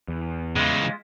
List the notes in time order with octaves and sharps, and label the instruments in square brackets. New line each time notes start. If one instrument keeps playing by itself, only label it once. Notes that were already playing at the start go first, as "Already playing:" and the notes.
[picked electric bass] E2
[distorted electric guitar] C#3 E3 [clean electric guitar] G#3 F4